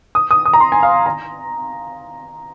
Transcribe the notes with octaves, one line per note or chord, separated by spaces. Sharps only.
D#6
D#6
D#6
A#5
C6
G#5
F5
A#5